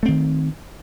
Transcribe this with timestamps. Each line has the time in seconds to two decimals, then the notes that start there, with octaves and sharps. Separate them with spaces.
0.03 A3
0.06 C4
0.08 D#3